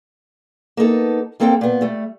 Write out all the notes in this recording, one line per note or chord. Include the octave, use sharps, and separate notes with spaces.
A#3 B3 D#4 A4
G3 A#3 C4 A4 F#5 G5
A#2 B3
G3 A3